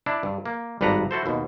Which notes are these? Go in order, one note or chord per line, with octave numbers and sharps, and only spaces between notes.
D4 E4
G2
A#3
G#1 G2 D4 B4 F#5 A#5
E4 F#4 A4 C5
D#2 B2